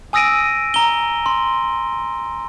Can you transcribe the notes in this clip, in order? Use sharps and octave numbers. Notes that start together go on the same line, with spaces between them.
G#5 D#6 E6 A#6 D7 D#7
A#5 G7
C6